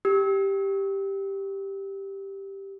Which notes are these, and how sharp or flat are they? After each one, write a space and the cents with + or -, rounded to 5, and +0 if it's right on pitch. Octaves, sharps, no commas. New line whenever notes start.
G4 +0 E6 -35